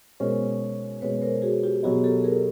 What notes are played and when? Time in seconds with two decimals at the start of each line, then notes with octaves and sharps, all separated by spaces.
0.20 B2 G#3 C#4 A#4 C5
1.01 B2 G#3 C#4 B4 C#5
1.22 A#4 C5
1.42 F#4 G#4
1.63 F4 G4
1.83 B2 F#3 B3 D#4 F#4 G#4
2.04 G4 A4
2.24 G#4 A#4